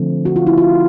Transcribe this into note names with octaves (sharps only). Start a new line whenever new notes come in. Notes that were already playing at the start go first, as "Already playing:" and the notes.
Already playing: D3 F3 A3 C4
F#4
F4
E4
F4